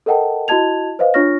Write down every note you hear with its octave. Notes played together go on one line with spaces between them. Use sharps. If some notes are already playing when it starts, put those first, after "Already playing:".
A4 A#4 D#5 F#5 G5 A5
E4 F#4 D#5 A5 G#6 F7
B4 C5 D#5 F5
D4 F4 C#5 C#6 F6 A#6